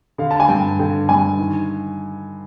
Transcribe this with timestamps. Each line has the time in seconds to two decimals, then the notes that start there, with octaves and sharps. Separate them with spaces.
0.18 D3 F5
0.31 A5
0.40 G#5
0.49 G2 G5
0.79 D3 G5
1.09 G2 G#5
1.39 D#3